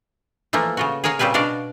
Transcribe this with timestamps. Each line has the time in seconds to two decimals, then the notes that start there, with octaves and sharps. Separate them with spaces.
0.53 E3 F3 A3 A#3
0.77 C#3 F4 F#4
1.04 G#4 A#4 C#5 F5 F#5
1.19 A#2 C#3 G3 C4 B4 G#5
1.34 B2 D4 F#4 D5 F5